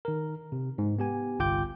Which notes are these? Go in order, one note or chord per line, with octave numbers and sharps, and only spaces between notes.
D#3 A#4
C3
G#2
B3 G4 G#5
G1 C2 F4 G5 D6 G6